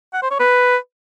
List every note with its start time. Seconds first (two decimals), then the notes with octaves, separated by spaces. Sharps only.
0.13 F#5
0.22 C5
0.31 C#5
0.40 B4